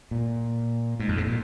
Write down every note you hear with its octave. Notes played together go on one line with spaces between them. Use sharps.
A#2
G#2
F2
G#2
A#2